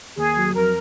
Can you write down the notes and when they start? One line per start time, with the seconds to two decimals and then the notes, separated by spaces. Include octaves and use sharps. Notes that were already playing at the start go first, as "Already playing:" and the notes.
0.17 D#2 G#4
0.37 F#3
0.55 F2 A#4